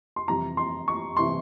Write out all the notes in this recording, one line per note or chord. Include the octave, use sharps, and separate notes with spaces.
C6
F2 C3 E3 G3 A#5
C6
C#6
C3 E3 G3 C6